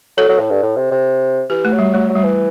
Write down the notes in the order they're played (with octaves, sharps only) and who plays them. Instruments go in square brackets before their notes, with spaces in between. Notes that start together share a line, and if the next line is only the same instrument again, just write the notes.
[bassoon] F#3 [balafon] A4
[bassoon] F#3
A2
G2
A2
C3
C3
[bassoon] E3 [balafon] G4
[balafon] A3
[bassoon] F#3
[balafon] G3
[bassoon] F#3 [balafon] A3
[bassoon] F#3
[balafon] G3
[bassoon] E3